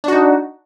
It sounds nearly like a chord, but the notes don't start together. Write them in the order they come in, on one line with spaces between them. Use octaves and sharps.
D4 F#4 D#4